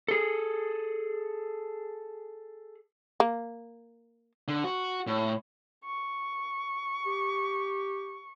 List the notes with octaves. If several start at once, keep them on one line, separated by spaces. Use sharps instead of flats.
G#4 A4
A#3
D3
F#4
A2
C#6
G4